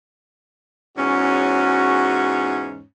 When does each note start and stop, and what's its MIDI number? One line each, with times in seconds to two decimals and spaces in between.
0.97 2.82 40
0.97 2.82 44
0.97 2.82 61
0.97 2.67 66